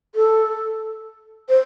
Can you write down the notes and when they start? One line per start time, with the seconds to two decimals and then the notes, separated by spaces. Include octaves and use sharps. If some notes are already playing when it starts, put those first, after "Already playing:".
0.15 A4
1.49 C5